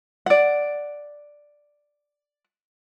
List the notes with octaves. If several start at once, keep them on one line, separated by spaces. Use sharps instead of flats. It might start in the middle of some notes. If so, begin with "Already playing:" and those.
D5 F#5